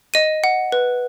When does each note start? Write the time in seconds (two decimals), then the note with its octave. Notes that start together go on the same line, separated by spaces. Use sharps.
0.14 D#5 D#7
0.44 F#5
0.72 B4